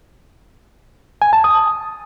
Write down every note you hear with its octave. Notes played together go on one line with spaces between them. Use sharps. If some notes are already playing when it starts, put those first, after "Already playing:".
G#5
A5
D#6